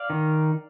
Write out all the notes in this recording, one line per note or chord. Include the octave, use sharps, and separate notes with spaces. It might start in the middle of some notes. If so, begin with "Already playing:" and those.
Already playing: D5 F5
D#3